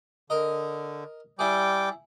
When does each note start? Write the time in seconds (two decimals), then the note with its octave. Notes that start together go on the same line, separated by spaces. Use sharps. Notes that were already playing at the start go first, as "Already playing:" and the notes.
0.30 D3 A#4 D#5
1.39 G3 E4 G#4 G5 D6